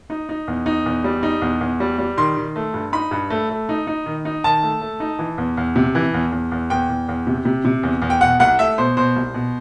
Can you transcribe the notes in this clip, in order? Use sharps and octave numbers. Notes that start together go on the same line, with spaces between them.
D#4
D#4
E2
D#4
E2
G3
D#4
E2
E2
G3
G3
D#3 C6
D#3
A3
G2
D#4 B5
G2
A3
A3
D#4
D#4
D#3
D#4
D#3 A5
A3
A3
D#4
E3
E2
E2
C3
E3
E2
E2
E2
E2 G5
E2
E2
C3
C3
C3
E2
E2
G5
B2 F#5
C2 F#5
A3 E5
B2 C5
B2 C5
C2
B2